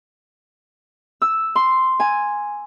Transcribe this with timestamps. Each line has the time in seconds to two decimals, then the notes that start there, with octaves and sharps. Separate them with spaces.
1.22 E6
1.56 C6
2.00 G#5